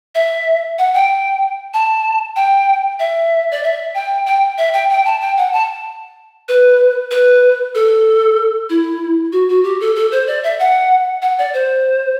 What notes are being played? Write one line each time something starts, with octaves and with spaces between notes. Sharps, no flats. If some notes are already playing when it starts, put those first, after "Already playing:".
E5
F#5
G5
A5
G5
E5
D5
E5
G5
G5
E5
G5
G5
A5
G5
F#5
A5
B4
B4
A4
E4
F#4
F#4
G4
A4
A4
C5
D5
E5
F#5
F#5
D5
C5